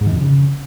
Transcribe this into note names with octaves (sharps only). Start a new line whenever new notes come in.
G#2
D#3
F2
D3
C#3